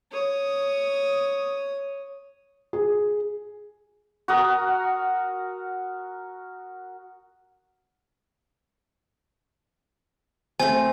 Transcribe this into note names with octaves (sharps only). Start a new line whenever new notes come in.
C#5 D#6
G#4
F#4 A#4 D#6
A3 C4 G#5